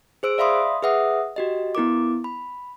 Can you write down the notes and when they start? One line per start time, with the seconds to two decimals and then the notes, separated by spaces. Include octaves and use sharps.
0.23 G#4 C5 E6 D7
0.38 D5 E5 F5 B5 C6 D#6
0.83 G#4 B4 E5 F#5 D#6
1.36 F#4 G4 D#5
1.75 B3 E4 A#4 D6
2.24 B5